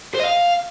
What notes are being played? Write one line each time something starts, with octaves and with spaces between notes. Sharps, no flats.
C5
D#5
F5